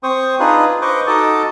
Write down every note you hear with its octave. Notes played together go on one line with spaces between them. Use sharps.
C4 C5 C#6 D#6
D4 D#4 F4 G#4 B4
B4 C5 D#5 C#6 D6
D#4 F#4 A4 D#5 A5 D6